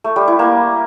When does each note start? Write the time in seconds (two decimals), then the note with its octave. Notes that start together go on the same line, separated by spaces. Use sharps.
0.04 A3
0.16 G3
0.28 E4
0.39 A#3